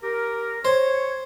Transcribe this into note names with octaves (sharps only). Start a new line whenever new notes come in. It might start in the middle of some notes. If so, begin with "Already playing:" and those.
G4 A#4
C5 C#5